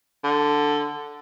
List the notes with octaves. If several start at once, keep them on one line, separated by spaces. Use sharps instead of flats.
D3